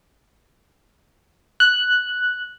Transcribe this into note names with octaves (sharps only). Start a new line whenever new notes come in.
F#6